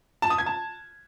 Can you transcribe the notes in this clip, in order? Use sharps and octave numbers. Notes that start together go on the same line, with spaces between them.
A5
D#6
G#6
A5